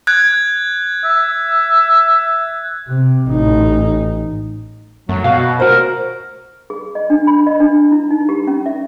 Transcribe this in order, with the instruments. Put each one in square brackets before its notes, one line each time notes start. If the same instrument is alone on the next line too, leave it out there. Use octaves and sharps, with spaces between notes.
[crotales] F#6 G#6
[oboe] E5
[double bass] C3
A1 D#4
[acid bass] F#2 [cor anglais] F#3 [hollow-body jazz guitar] A3
[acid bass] B2 [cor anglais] F#4 [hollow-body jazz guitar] F5
[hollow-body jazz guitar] F#4 C5 [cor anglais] A#4
[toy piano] G#4
D#5
D4
B5
D#5
D4
E4
D#4
G4
C#4
E5